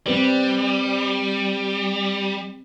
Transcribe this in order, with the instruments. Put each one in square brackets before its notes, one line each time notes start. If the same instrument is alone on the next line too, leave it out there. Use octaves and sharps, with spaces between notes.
[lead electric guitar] G3 [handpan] C4 B4 D5